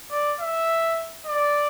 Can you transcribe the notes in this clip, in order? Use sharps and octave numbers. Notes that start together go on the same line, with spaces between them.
D5
E5
D5